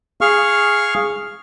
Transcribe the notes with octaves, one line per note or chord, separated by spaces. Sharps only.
G#4 F5 C#6 F6